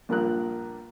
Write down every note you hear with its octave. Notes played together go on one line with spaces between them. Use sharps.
A#1 G2 A#3 F4 A#4 F#6